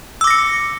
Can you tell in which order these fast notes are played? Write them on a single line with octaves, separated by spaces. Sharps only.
E6 D6 A#6 C#7